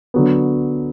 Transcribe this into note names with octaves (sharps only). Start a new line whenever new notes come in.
D3 F#3 B3